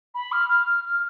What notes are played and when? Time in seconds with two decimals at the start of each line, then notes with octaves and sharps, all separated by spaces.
0.15 B5
0.32 F6
0.49 F6
0.67 F6
0.84 F6